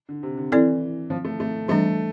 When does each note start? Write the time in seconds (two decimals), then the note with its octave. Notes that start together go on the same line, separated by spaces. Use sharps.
0.09 D3
0.23 C3
0.37 D3
0.52 E3 C4 E4 A4 D5
1.10 F3
1.25 A3
1.40 A3
1.68 E3 G3 A3 D4